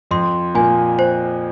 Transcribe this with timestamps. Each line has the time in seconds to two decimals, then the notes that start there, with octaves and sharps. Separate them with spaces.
0.11 F2 F3 C6
0.54 A#2 A#3 G#5
0.99 C5